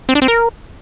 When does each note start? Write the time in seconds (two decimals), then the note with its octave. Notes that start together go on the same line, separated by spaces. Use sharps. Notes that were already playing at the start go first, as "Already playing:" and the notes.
0.09 C4
0.15 D4
0.22 C4
0.28 A#4